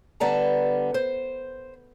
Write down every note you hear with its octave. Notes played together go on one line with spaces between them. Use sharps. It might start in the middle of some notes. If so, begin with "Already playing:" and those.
D3 G3 B3 D5 A5 A#5
C5